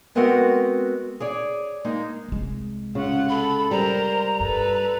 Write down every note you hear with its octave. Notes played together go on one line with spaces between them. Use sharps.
G#3 B3 C4 F#4 A#4 F#5
G#4 C#5 D5
G#3 A#3 D#4
C2 G#3
C#3 F4 F#5
A4 B5
G3 A#4 C5 A#5
G2 A4 B4